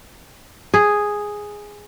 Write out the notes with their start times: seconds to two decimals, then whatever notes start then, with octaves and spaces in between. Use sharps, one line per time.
0.74 G#4